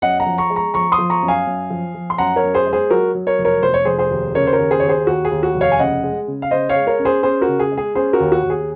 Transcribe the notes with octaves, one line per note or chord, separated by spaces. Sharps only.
F#2 D#5 F#5
F#5 A#5
F3
A#5 C#6
G#3
A#5 C#6
F3 A#5 C#6
C6 D#6
F3
A#5 C#6
F#2
F5 G#5
F#2
F3
F3
C6
F#2 F#5 A#5
A#4 C#5
F#2
G#4 C5
G#3
G#4 C5
F#3 F#4 A#4
F#3
A#4 C#5
F1
A#4 C#5
F1 C5
C#5
F1 G#4 C5
G#4 C5
D#2
C#3 A#4 C#5
C5
A#4 C#5
D#2
G#4 C5
D#2 C#5
G#4 C5
D#2 F#4
G#4
D#2
F#4
F1
C#5 F5
G#5
C#3 D#5 F#5
G#3
C#3
F5
C#3 C5 D#5
C#5 F5
G#3
A#4 C#5
C#4
G#4 C5
C#4 G#4 C5
F#4 A#4
C#3
G#4
G#3
G#4
C#4 G#4 C5
F#4 A#4
D#2
F#4
D#2
G#4